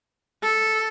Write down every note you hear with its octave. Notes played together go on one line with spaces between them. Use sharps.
A4